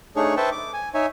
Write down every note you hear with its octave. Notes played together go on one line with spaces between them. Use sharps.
A3 D4 D#4 G#4 C#5 C#6
B4 C5 E5 G5 A5 C#6
D6
G#5
D#4 C#5 E5 G#5